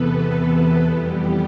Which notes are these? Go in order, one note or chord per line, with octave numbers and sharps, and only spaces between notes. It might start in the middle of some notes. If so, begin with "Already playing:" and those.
Already playing: E2 C3 E3 B3 A4 B4
F2 E3 G3 B3 G4